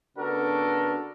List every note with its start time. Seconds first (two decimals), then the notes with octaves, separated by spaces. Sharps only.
0.17 C#3 B3 D4 F#4 A4 A#4